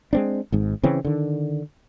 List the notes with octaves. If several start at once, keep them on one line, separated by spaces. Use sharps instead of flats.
G#3 C4 D4
G#1 G#2
C#3 E3 C4 C#4
D3 D#3